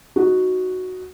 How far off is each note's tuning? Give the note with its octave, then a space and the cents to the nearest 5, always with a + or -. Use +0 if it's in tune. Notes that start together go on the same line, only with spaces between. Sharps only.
D#4 +0 F#4 +0